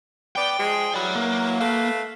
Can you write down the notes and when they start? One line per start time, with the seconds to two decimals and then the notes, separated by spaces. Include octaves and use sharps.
0.36 B3 D5 G5
0.59 F3 G#3 G#4
0.94 E3 F#3 D5 B5
1.15 A#3
1.60 A3 B4 F5